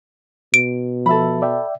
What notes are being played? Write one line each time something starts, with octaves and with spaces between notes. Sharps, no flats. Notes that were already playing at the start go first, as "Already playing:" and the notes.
B2 D7
F3 A4 E5 B5
D5 E5 G5